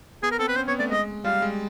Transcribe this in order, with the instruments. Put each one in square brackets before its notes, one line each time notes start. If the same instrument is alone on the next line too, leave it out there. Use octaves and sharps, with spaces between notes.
[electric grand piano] B3 [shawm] G#4
[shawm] A#4
[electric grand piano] C4 [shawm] A4
[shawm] B4
[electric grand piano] C#4 [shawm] C5
[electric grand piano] B3 [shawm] C#5
[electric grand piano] A3 [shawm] D5
[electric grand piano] G#3 [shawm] D#5
[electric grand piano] G3 [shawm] F5
[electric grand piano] G#3